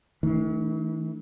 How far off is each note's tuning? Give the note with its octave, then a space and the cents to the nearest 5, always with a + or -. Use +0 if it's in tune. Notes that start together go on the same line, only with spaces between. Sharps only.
E3 -45 A3 +0 D4 +15